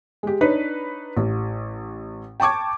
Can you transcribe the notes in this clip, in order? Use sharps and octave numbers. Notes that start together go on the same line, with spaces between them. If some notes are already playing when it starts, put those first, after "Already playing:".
G#3 G4
D4 D#4 B4 C#5
A1
G5 A5 C#6 D6 G#6